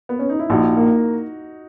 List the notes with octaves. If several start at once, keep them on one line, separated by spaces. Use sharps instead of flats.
B3
C#4
D#4
E4
A#1 D#4 F#4
A#3